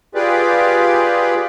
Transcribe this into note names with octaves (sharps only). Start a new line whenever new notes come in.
F4 G4 G#4 B4 D5